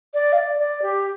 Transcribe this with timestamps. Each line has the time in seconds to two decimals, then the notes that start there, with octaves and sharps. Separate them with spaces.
0.14 D5
0.33 F5
0.38 D5
0.59 D5
0.82 G4